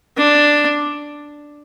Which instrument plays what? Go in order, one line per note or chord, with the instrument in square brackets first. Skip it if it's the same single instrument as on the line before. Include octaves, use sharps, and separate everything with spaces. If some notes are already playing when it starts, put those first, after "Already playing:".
[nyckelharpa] D4